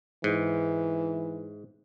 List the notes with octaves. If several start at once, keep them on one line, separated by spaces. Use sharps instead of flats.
G#2 E3